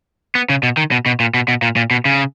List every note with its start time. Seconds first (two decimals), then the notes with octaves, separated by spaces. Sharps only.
0.35 B3
0.49 C#3
0.63 B2
0.77 D#3
0.91 B2
1.06 B2
1.20 A#2
1.34 B2
1.48 B2
1.62 A#2
1.76 A#2
1.91 B2
2.05 C#3